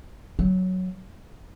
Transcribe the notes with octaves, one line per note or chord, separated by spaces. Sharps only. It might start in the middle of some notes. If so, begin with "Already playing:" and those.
F#3